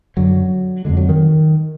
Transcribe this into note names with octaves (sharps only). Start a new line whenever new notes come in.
F#2 D3 F#3
F2 D3 G#3
F#3
D#3